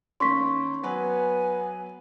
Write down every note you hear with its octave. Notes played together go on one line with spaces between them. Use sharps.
D#3 A#3 C#4 C6 C#6 B6
F#3 B3 B4 G#5